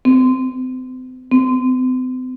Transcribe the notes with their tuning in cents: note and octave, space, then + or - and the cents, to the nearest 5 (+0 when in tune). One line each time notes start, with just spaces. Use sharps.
C4 -40
C4 -45